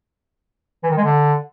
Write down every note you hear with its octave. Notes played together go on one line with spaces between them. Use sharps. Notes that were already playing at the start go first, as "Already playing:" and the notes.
E3
D#3
G#3
D3